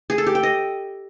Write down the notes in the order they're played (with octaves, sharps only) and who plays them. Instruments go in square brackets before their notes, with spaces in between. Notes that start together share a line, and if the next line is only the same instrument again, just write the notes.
[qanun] G#4
A4
G4
G5
D#5